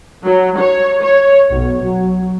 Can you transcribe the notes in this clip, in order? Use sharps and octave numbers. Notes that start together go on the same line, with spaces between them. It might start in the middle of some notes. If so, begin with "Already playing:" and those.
F#3
C#5
C#5
B1
F#3